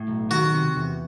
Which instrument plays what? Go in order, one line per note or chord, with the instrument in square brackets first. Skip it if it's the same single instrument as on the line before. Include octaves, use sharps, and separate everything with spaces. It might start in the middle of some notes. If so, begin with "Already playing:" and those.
Already playing: [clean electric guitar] A2
B1
[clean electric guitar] D#3 [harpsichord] F#4
[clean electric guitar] C3
E2